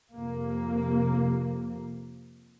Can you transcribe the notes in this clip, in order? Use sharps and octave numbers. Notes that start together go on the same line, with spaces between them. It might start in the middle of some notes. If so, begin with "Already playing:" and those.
F2 C3 A#3